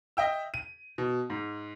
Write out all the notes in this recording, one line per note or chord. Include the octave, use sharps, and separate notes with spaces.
D#5 E5 G5 E6
D#7
B2
G#2